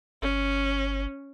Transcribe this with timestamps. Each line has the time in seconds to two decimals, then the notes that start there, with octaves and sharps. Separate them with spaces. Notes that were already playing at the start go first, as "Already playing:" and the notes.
0.22 G1 C#4